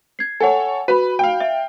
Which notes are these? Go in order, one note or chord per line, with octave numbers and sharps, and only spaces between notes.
G#6 C7
A4 C#5 F#5 G#5
F#4 B4 B5
F5 G5
E5